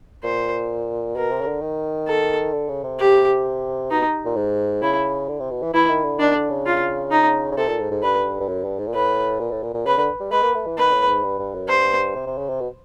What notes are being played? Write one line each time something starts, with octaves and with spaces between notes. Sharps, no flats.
A#2 C5
B2 A#4
C3
C#3
D3
D#3
A4
D3
C#3
C3
G4
B2 D#4
A#2
G#2
C#3 E4
D3
C3
B2
E3
E3 E4
D#3
D3
D#3 D4
D3
C#3
F4
D#4
C#3
C3 A4
A#2
G#2
G#2
G2 B4
G2
F#2
G2
G#2
A#2
A2 B4
A#2
A2
A#2
A#2
C#3 B4
D3
G3
G#3 B4
A#3
A3
E3
D#3 B4
A2
G#2
G2
G2
F#2
G2 C5
C3
C3
C#3
C3
B2